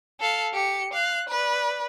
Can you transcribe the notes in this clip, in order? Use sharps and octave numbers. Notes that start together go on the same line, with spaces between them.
A4 F5
G4 C#7
F5 F#6
B4 D5